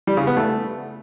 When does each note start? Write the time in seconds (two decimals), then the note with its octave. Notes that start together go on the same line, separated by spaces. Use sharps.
0.07 G3
0.17 C#3
0.27 B3
0.37 A3